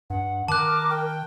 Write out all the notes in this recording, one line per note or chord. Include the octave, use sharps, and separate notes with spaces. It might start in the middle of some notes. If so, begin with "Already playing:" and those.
G2 F#5
D#3 A#4 A5 D6 F#6
G5